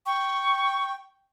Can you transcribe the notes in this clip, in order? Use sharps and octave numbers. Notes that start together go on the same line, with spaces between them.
G5 C#6